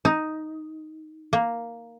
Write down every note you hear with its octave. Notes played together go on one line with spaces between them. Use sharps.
D#4
A#3